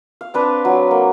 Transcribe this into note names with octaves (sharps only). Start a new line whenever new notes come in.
F5
C4 D4 B4
F#3
A#3